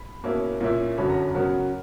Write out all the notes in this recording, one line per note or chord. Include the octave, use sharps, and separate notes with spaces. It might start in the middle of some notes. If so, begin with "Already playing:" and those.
Already playing: B5
B2 A#3 C#4 E4
A#2 A#3 C#4 E4
F#2 D3 F#3 C#4 B5
A#5
C#3 F#3 B3 A#4